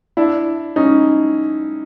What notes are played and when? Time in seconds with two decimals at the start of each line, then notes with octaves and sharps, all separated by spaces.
0.17 D4 E4
0.76 C#4 D#4